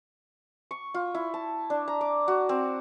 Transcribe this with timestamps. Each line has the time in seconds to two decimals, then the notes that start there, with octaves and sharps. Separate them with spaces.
0.71 C#6
0.94 F4
1.14 E4
1.34 A5
1.70 D4
1.88 A#5
2.01 D6
2.28 F#4
2.49 C4